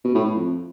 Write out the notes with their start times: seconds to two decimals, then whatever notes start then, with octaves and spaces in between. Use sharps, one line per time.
0.04 B2
0.15 A2
0.25 A2
0.36 F2